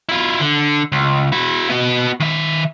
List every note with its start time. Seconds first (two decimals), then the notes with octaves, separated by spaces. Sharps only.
0.09 E4 F4
0.40 D3
0.92 C#2
1.32 E4 F#4
1.70 B3 F#4
2.20 D#3 E5